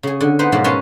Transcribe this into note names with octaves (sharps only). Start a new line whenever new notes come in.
C#3 G#4
D3
B3 D#4 B4 C5
G#2 B2 F3 F#3 A#3
C#4 A#4 B4 C#5 A5 C6